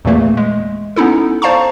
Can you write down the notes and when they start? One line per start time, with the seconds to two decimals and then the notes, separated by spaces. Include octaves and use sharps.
0.05 E2 A#2 E3 A3 A#3
0.37 G#3
0.96 B3 C#4 D#4 E4 A4
1.42 C5 D5 F5 A5 A#5 C#6